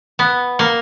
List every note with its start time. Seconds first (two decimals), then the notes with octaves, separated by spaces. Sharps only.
0.19 B3
0.59 A#3